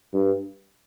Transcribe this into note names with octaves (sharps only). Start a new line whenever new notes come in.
G2